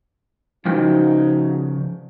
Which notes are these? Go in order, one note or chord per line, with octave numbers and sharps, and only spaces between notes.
C#3 F3 D#4 F#4 G5